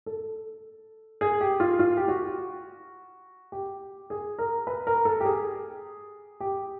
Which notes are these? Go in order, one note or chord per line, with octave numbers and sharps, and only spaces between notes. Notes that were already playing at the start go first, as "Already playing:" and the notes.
A4
G#4
G4
F4
F4
G4
F#4
G4
G#4
A#4
B4
A#4
A4
G4
G#4
G4